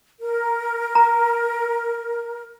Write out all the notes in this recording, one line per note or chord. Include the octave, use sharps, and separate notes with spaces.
A#4
A#5